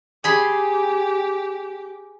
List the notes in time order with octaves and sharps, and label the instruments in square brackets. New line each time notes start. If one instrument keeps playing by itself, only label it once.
[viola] G4 [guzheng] G#4 B5 C6